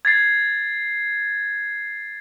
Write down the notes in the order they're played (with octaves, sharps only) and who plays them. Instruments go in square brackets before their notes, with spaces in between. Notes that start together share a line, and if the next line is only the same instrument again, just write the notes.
[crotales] G#6 A6 C7